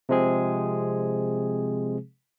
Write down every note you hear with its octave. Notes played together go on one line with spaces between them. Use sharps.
C3 F3 G#3 C4 G#4